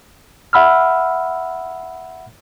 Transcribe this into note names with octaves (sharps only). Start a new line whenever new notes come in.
E5 F#5 B5 E6 F6